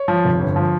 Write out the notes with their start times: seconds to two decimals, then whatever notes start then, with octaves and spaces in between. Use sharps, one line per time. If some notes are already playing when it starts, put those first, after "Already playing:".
Already playing: C#5
0.08 F3
0.25 F1
0.40 G1
0.56 F3